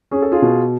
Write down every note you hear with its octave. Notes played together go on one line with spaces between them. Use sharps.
C#4 G#4
A4
F4 G#4
B2